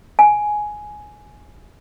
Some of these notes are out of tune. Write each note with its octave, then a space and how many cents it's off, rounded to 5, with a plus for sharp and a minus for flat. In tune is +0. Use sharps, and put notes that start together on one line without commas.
G#5 +10